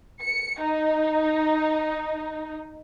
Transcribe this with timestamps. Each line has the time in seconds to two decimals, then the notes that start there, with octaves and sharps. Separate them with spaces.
0.20 C#7
0.59 D#4